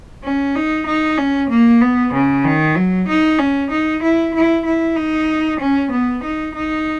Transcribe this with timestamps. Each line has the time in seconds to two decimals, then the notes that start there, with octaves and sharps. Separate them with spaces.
0.24 C#4
0.55 D#4
0.86 D#4
1.18 C#4
1.50 A#3
1.81 B3
2.13 C#3
2.44 D#3
2.76 F#3
3.08 D#4
3.39 C#4
3.71 D#4
4.02 E4
4.34 E4
4.65 E4
4.96 D#4
5.60 C#4
5.91 B3
6.23 D#4
6.55 D#4